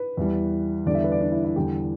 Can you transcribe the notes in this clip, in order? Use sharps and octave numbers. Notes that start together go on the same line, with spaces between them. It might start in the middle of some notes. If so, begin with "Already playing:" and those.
Already playing: B4
E2 E3 G3
E2 D3 G3 D5
E5
B4
D5
D4
E4
E4
E2 D3 G3 G4